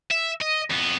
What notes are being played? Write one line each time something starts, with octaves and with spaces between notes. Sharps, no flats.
E5
D#5
F2 B3